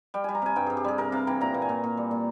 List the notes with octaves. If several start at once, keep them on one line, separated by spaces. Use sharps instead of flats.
G3 G5
G3 G#5
A#5
C3 G#5
G2 G5
G2 G#4
G4
G3 G#4
C3 A#4
C3 F5
E3 G5
A#2 A#5
A#2
G#5
A#2
A#2
G3
A#2